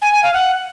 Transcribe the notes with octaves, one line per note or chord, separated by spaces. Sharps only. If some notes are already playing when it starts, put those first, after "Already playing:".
G#5
G#5
F5
F#5